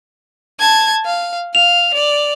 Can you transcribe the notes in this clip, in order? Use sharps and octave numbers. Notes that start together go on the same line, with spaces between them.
A5 G#6
F5
F5 F7
D5